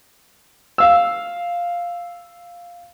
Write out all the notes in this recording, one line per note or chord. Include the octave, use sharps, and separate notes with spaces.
F5 E6